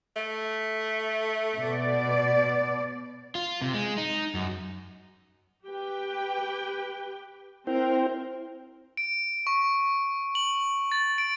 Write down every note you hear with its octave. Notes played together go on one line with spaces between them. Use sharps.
A3
B2 D5
F4
C3
G#3
D#4
F#2
G4 B4 G5
C4 E4 A#4 C5 G5
D7
C#6
F#7
A6
D7